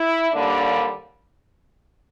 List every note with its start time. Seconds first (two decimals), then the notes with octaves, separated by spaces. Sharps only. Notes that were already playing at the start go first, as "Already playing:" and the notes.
Already playing: E4
0.33 D#2 D3 G3 A#3 D4